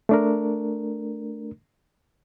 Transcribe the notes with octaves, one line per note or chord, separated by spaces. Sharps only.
A3 D4 A#4